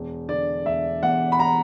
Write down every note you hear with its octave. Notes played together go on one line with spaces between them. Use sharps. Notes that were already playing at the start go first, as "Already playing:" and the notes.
Already playing: E1
D3 D5
E1 E5
E2 F#5
B5
A#5